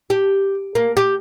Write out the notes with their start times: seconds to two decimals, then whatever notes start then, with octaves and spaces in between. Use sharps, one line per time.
0.10 G4
0.75 A#3
0.97 G4